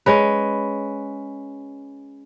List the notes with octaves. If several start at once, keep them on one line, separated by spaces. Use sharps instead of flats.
G#3 C#4 B4